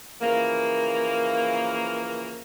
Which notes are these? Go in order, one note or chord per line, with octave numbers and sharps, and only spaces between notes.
C#3 E3 F3 A#3